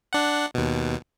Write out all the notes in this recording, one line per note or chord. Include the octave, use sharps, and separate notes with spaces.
D4 F#5
D#2 B2